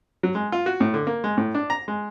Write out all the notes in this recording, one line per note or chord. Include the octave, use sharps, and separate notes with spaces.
F#3
G#3
F4
F#4
A2
D3
A#3
G#3
A2
D4
A#5
G#3